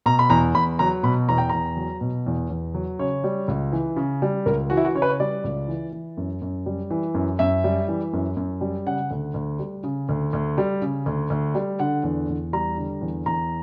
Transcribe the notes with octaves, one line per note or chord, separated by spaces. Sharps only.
B2 A#5
B5
E2 A#5
E2 B5
F#3 A#5
B2 B5
E2 A#5
G5
E2 A#5
F#3
B2
E2
E2
F#3
C#3 C#5
G3
C#2
E3
C#3
G3
C#2 A#4
E3 F#4
E4
F#4
C#3 C#5
B4
C#5
G3 D5
C#2
E3
E3
F#2
F#2
G3
E3
F#2
F#2 E5
G3
E3
F#2
F#2
G3
C#3 F#5
D2
D2
G3
C#3
D2
D2
G3
C#3
D2
D2
G3
D3 F#5
E2
E2
G3 A#5
D3
E2
E2 A#5